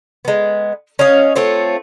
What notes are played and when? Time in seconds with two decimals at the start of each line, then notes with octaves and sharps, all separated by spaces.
0.25 G#3 B3
0.99 C#4 C#5 D#5 F5
1.36 A3 C4 F4 C#5